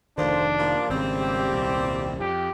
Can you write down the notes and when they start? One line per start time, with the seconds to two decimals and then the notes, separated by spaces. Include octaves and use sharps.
0.18 F1 D2 D#3 D4 F4 C5
0.58 F3 G3 A#3
0.90 G#1 C#3 G3 A#3 C4
1.21 G4
1.50 D#1 C2
2.20 F2 G4